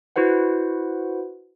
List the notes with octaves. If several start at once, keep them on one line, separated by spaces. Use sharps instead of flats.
E4 F#4 B4 C5 F#5